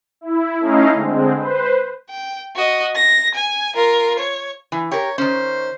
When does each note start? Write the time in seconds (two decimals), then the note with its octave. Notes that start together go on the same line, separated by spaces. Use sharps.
0.21 E4
0.60 A3 C#4 D#4 E4 D#5 F5
0.94 D3 G#3 C4
1.36 B4 C5
2.10 G5
2.56 F#4 D#5
2.95 A#6
3.34 G#5
3.75 F4 A#4
4.19 C#5
4.72 E3
4.91 G4 A#4 C#5
5.18 D#3 C#4 C5